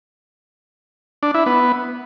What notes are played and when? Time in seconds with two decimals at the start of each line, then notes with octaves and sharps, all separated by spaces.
1.23 D4
1.34 E4
1.46 B3